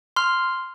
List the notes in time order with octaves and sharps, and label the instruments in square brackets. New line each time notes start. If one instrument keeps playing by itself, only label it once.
[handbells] C6 F6